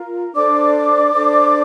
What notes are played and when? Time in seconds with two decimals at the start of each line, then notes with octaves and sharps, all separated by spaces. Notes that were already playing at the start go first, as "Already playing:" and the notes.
Already playing: F4 A#4
0.35 D4 A4 C5 D5 D6
1.12 D4 A4 C5